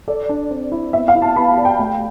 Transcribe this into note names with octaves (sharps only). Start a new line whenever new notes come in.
A4 D5
D4
C4
E4
B3 E5
F5
E4
A5
B3 B5
A5
D5
G5
A3 G5